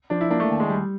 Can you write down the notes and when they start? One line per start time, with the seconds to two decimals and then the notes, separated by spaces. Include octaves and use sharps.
0.10 F3 D4
0.21 E4
0.31 A#3 D4
0.40 A3
0.51 D#2
0.60 G#3
0.70 G3